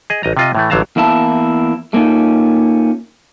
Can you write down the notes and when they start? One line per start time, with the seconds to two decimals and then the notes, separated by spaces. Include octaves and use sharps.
0.10 G#4 D#5
0.23 A1 D#5 A#5
0.37 C3 F4 D#5
0.55 A2 E3 A3
0.70 A1 D3 F#3 F5 A5 A#5
0.96 E2 A#3 E4 A5
1.93 A3 A#3 C#4 D#4 F4